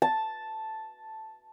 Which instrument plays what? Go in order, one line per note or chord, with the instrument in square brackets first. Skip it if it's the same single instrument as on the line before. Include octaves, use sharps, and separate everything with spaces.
[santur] A5